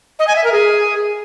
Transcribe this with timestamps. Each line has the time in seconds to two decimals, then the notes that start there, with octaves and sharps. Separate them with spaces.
0.19 D#5
0.27 G#5
0.36 E5
0.44 A#4
0.52 G#4